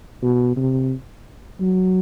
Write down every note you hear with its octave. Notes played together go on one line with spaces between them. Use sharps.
B2
C3
F#3